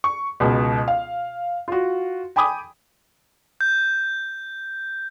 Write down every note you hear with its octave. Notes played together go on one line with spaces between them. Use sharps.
C#6
C#2 B2
F5
F4 F#4
G5 G#5 B5 D6 D#6
G6